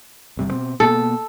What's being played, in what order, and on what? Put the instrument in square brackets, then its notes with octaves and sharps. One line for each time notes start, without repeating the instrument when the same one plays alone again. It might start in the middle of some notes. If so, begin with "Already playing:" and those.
[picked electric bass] G1 C3 G3
B2 C4
[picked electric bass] B2 A#3 B3 [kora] A4